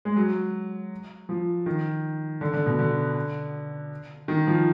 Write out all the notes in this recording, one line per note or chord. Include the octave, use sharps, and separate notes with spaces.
G#3
F#3
F3
D#3
D3
D3
B2
D3
D#3
F3